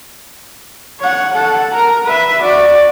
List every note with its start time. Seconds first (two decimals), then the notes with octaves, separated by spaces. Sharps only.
1.00 C#5 F#5
1.34 A4 F#5
1.74 A#4 A#5
2.05 B4 E5
2.42 F#4 D5